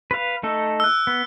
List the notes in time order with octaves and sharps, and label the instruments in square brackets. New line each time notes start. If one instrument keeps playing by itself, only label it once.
[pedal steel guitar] B4 F5
A3 D#4 A4
[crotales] E6 F#6
[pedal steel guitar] B3